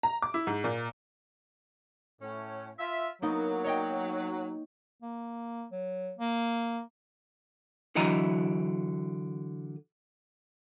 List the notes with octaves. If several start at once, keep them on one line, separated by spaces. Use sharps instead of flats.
A#5
D6
E4
G#2
A#2
A2 C#4
F4 E5
F#3 A#3 B3 D#4
C#5 D#5 G5
A#3
F#3
A#3
D3 E3 F#3 E4 D#5 A#5